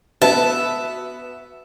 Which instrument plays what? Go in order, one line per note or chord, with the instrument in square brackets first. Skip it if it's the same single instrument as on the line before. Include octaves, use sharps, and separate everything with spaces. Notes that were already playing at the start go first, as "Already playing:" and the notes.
[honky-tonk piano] B3 F#4 B4 [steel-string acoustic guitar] E5 [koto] A5